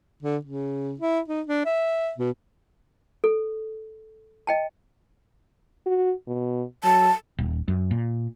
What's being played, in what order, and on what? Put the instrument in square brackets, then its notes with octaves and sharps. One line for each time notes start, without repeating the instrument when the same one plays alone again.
[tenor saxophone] D3
C#3
E4
D#4
D4
E5
B2
[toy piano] A4
D#5 G5 A5
[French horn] F#4
B2
[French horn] F#3 [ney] A5
[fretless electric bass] D#1
F#2
A#2